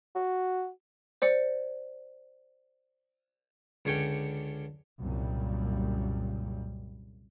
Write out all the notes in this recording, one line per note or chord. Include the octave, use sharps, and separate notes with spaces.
F#4
C5 D5 C#7
C#2 D3 C#4 C#5 G5
C2 F#2 A#2 C#3 G3